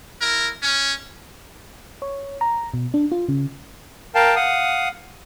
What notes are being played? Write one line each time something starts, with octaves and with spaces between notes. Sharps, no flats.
E4 A#4
C#4
C#5
A#5
B2
D4
F4
C#3
A#4 F5 G5 A5
F5 F#5 D#6